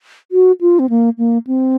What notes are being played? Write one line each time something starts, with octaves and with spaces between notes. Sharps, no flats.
F#4
F4
C4
A#3
A#3
C4